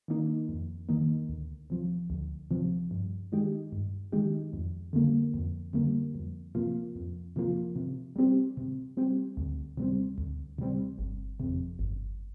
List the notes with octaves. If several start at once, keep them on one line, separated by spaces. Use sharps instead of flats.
D#3 A#3 D#4
F2
D#3 A#3 D#4
D2
C3 F3
D2
C3 F3
G2
D#3 G#3 D#4 G4
G2
D#3 G#3 D#4 G4
F2
D3 G3 A#3
F2
D3 G3 A#3
F2
C3 F3 A#3 F4
F2
C3 F3 A#3 F4
C3
G3 C4 G4
C3
G3 C4 G4
D2
C3 G3 C4
D2
C3 G3 C4
G1
F2 C3
G1